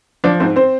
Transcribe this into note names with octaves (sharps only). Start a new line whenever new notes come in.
F3 D4 D5
G#2 C4 C5
C4 C5